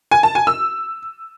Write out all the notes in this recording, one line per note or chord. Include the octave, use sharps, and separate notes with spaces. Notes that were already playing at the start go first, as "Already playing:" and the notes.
G#5
A5
G#5
E6